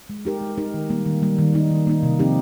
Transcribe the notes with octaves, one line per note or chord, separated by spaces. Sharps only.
G#3
D#4 G4 A#4
G#3
D#4 G4 A#4
D#3
G3 A#3
D#3
G3 A#3
D#3
A#3 D#4
D#3
A#3 D#4
C3
F3 C4 D#4 G4